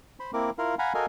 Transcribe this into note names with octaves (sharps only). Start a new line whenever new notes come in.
C5 B5 C6
A#3 C4 E4 A#4 D6
E4 F4 A#4 F5
F5 F#5 G#5 A#5 B5
F#4 A4 A#4 D#5 F5 G#5